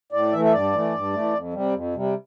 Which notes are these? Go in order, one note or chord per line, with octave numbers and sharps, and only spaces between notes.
A2 D5
E3 A3 E5
E5
G2 D5
E3 A3
G2
E3 A3
F2
C3 G3
F2
C3 G3